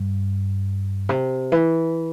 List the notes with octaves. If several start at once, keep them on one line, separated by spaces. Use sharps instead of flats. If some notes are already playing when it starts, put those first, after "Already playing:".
Already playing: G2
C3
E3